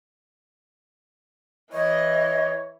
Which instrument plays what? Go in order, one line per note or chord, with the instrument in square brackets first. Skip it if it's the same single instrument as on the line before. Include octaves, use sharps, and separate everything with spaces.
[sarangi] E3 [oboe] C#5 [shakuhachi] D#5